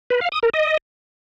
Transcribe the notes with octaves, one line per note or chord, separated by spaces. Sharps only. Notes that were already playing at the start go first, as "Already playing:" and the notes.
B4
F5
D#6
A#4
D#5